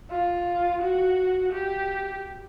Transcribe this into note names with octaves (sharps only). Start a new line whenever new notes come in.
F4
F#4
G4